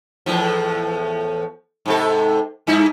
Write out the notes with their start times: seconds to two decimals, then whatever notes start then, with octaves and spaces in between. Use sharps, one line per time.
0.26 E2 A2 F3
1.86 G#2 C3 A4
2.67 G2 D#4 E4